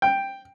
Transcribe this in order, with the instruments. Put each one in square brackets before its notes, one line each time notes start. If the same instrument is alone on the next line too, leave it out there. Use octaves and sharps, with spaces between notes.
[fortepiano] G5